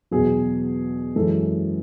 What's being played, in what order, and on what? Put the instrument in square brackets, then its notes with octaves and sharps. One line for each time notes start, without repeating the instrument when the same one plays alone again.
[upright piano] E2 B2 F#3 G#4
F#2 E3 G#3 A4